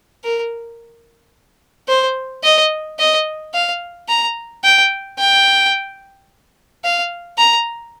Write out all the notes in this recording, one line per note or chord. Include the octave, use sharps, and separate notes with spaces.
A#4
C5
D#5
D#5
F5
A#5
G5
G5
F5
A#5